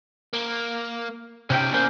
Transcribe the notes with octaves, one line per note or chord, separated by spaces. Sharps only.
A#3
C3 C#4 D#4 G4 G5
E2 A#3 C#4 C5